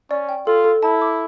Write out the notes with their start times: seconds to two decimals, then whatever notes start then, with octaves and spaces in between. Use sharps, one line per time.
0.10 C#4 D5
0.29 G5
0.47 F4 A4
0.64 A4
0.83 E4 A5
1.01 D6